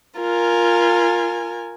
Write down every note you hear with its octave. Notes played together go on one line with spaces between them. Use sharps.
F4 A#4 G#5